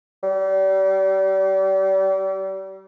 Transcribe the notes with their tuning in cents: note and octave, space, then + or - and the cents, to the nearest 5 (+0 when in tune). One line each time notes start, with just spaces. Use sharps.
G3 -35